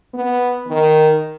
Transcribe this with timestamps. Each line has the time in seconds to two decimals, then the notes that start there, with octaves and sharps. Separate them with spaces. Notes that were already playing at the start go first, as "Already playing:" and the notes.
0.14 B3
0.68 D#3